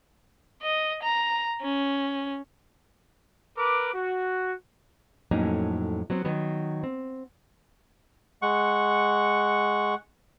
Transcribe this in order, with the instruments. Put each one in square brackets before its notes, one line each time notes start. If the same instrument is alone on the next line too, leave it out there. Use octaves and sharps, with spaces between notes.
[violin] D#5
A#5
C#4
[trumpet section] A#4 B4 D6
F#4
[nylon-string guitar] F2 A2 F#3 A#3 C#4 D#4
F#3 B3 C4
D#3 F#3 B3
C4
[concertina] G#3 F#5 C#6